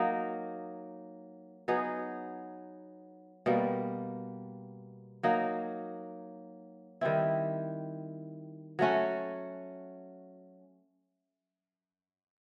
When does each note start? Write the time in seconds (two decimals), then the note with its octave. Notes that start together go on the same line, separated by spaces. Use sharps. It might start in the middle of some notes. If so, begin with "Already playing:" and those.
Already playing: F#3 A#3 D#4
1.68 F#3 B3 D#4 G#4
3.46 B2 G3 A#3
5.23 F#3 A#3 D#4
7.01 D#3 G3 C4 E4
8.79 F#3 A3 C#4 F#4